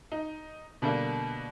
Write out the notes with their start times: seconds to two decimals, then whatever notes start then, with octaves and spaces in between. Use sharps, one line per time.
0.12 D#4
0.82 B2 D3 G3 A#3